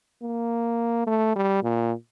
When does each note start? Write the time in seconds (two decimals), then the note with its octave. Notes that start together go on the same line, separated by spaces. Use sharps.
0.23 A#3
1.07 A3
1.36 G3
1.63 A#2